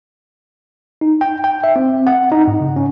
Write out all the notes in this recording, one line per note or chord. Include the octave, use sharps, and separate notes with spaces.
D#4
G5
G5
E5
C4
F#5
D#4
G#2
C#3
C#4